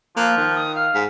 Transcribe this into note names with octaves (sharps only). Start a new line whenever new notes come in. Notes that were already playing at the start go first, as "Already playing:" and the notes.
F3 A#3 F#6
D#3
D#6
F5 F6
G#2 B6